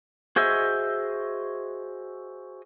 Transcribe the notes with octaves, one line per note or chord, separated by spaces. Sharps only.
F#4 G#4 C5 D#5 E5